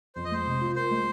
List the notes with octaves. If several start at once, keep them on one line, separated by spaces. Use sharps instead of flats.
F2 C5
D#5
G#3 C5
C3
F4
A#4 C5
G#3